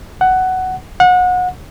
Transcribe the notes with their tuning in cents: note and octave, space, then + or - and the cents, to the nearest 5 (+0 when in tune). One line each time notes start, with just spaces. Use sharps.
F#5 +10
F#5 -30